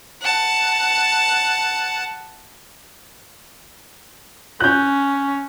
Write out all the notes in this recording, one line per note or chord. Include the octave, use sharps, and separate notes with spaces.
F#5 A5
C#4 F#6 G6